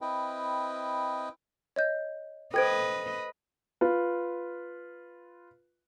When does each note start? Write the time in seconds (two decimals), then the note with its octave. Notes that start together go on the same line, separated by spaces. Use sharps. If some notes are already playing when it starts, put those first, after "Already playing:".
0.01 C4 E4 B4 D#5 G5
1.76 C#5 D#5 G6
2.54 A4 B4 C5 D#5 G5 G#6 D7
3.81 F4 B4